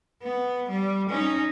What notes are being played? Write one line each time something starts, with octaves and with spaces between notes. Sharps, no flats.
B3
G3
C#4 D#4